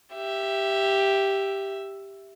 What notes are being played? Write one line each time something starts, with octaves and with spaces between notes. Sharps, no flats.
G4 E5